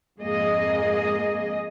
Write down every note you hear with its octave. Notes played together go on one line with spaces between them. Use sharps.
F2 G#2 G#3 A#3 G#4 D#5